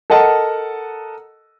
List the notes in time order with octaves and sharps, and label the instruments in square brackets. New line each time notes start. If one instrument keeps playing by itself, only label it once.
[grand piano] A4 A#4 D#5 F#5 A5